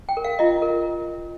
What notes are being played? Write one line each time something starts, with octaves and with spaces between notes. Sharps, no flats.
G5
A#4
F5
F4 D#5
A#4